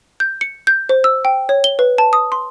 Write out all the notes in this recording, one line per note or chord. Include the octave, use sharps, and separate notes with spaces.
G6
C#7
G6
C5
E6
G5
C#5
G7
B4
A5
D#6
C6